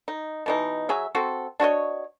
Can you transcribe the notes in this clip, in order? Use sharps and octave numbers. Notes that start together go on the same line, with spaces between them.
D#4
B2 E3 D#4
F#3 G#4 E5
C4 F#4 A4
D4 F#4 C#5 D#5